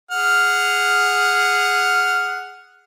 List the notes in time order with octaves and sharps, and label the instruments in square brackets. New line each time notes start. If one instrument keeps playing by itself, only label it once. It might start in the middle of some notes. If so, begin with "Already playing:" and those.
[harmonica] G#4 F#5 F6